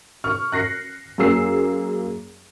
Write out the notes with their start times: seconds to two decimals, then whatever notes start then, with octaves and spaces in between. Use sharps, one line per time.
0.24 C#6 F6
0.52 F#6 A#6 C7 C#7
1.18 F#2 A#3 G#4 E6 C7